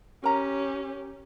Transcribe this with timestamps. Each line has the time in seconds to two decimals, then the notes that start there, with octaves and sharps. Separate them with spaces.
0.24 C#4 G4 A#4 A#5